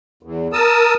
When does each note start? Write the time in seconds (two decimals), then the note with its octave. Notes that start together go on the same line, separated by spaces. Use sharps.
0.23 E2
0.53 A#4 A5 D#6 E6